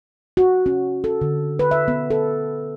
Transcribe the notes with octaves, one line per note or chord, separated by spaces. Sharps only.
F#4
C#4
A4
D3
B4
E5
B3
A4